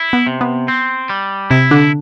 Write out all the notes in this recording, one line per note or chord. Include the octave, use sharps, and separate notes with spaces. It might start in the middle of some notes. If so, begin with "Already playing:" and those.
Already playing: E4
B3
C3
B3
C4
G3
C3 C4 E4
D3 D4